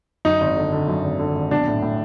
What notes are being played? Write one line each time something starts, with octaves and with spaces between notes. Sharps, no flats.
F#2 D#4
G#1
D3
D3
F#2
G#1
D3
G#1
B1 D4
A2
A2